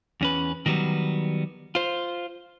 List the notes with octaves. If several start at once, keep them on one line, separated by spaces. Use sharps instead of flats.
E2 C#4 B4
D#3 F#3 G3 B3
F4 C5